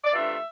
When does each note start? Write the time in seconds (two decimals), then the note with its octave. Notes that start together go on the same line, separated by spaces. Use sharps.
0.05 D5
0.13 C3 E3 A3 D4 F4 E5